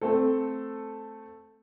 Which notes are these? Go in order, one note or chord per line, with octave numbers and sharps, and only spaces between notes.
A3 C4 A4